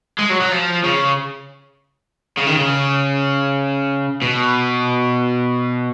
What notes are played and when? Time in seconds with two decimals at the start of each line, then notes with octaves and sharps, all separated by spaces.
0.19 G#3
0.30 F#3
0.41 F#3
0.52 F3
0.84 C#3
2.37 C#3
2.47 D#3
2.55 C#3
4.22 B2